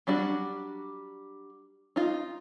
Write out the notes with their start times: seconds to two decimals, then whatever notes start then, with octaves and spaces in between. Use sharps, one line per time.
0.07 F#3 G3 D4 F#4
1.96 D#4 F4